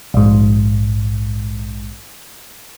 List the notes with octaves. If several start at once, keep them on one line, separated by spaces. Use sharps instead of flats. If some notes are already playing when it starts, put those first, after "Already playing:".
A#1 G#2